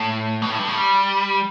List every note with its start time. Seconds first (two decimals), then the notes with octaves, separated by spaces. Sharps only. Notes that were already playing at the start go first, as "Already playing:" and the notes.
Already playing: A2
0.42 B2
0.50 A2
0.59 G2
0.68 A2
0.76 G3